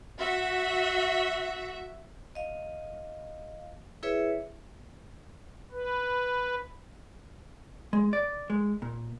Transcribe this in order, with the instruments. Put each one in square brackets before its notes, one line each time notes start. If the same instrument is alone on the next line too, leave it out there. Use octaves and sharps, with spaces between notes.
[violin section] F#4 E5
[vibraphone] D#5 F5
E4 G#4 B4 C#5 E5
[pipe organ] B4
[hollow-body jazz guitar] G#3
D5
G#3
A#2